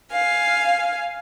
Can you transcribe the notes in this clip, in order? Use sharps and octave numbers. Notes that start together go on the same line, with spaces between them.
F5 G#5